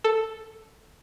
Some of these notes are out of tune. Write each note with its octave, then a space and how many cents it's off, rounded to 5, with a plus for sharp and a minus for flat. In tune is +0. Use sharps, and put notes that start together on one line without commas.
A4 +5